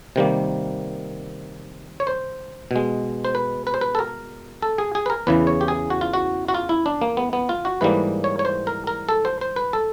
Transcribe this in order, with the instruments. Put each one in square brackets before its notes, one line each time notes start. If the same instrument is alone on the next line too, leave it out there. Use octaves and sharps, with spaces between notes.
[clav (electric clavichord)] C3 D#3 G3 A#3
C#5
C5
B2 G#3
C5
B4
B4
C5
B4
A4
A#4
A4
G#4
G#4
B4
A#4
E2 C#3 E3 B4
C#5
G4
G#4
F#4
F4
F#4
F#4
F4
E4
D4
A#3
B3
B3
F4
F#4
G#2 E3 G3 A#3 B4
C#5
C#5
C5
A#4
A#4
A4
C5
C5
B4
A4